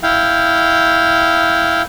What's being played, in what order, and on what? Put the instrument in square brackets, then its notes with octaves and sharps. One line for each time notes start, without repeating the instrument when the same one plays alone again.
[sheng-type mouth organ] E4 F5 G5